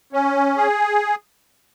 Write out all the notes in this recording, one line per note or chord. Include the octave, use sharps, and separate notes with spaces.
C#4
G#4